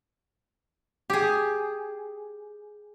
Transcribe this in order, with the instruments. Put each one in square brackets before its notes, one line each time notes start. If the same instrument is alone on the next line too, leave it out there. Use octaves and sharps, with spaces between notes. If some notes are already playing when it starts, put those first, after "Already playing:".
[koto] G4 G#4